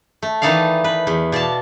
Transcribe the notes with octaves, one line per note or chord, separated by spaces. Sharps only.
A3
D#3 E3 D#4 A4 D5 F5
B4
E2
B2 D5 F5 A5